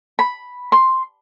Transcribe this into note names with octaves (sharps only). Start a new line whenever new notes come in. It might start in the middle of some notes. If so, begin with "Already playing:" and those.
B5
C6